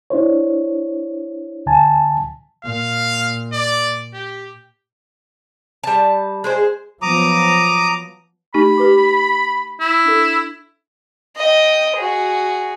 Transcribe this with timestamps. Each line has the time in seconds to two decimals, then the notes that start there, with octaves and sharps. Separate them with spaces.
0.10 D4 E4 C5 C#5
1.66 D2 D3 G#5 A5
2.65 A#2 F5
3.53 D5
4.14 G4
5.84 G3 A5
6.44 G#3 G#4 C5
7.02 F3 F#3 B3 A#5 D6 D#6
8.54 A3 D#4 G4 B5
8.78 G4 B4 D6
9.81 E4
10.05 D4 A4
11.37 D#5 G5
11.97 F#4 G#4